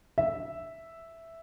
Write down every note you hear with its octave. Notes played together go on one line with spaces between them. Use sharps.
E5